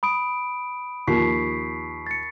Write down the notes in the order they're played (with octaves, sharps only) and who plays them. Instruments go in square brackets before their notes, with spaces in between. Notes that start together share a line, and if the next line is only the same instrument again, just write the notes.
[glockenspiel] B5 D#6 D7
[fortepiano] D#2 F3 [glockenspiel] C#6 B6 C7
[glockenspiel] A6 C#7